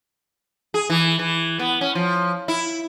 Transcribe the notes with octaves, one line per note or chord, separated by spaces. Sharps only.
G#4
E3
E3
B3
C#4
F3
E4